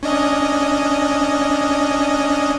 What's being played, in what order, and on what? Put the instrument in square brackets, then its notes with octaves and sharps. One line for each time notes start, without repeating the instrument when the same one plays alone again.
[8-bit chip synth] C#4 D4 D#5